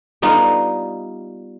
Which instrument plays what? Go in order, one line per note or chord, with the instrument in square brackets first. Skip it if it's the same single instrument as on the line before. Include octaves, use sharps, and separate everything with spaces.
[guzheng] G3 B3 D#4 F4